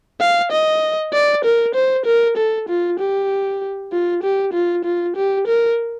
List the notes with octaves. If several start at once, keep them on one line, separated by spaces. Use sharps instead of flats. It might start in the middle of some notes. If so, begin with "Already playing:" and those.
F5
D#5
D5
A#4
C5
A#4
A4
F4
G4
F4
G4
F4
F4
G4
A#4